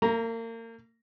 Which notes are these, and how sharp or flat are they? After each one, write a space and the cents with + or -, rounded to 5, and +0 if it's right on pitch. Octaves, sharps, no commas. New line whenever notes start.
A#3 -35 A#5 +0